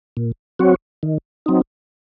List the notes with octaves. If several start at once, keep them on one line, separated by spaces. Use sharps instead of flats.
A#2
F#3 C4 F#4 C#5
D#3
F#3 C4 D#4